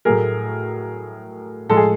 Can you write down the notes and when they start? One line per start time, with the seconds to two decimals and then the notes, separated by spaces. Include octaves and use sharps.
0.05 A2 F#3 A3 G#4 A#4
1.69 A2 F3 G#3 A4
1.77 G#4